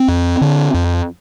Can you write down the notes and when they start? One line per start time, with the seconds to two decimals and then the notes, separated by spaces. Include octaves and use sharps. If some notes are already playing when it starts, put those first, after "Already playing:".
Already playing: C4
0.08 F2
0.41 D3
0.74 F2